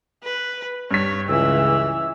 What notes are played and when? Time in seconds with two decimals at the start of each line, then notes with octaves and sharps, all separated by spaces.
0.24 B4
0.91 G2 C#5 B6
1.29 C#2 E3 E6